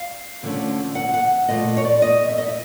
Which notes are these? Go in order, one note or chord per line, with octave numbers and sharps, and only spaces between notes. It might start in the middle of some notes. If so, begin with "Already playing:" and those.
Already playing: F5
F2 D3 F3 A3 C#4
F#5
F#5
A#2 F3 A3 D#5
C#5
D5
D#5
E5
D#5
E5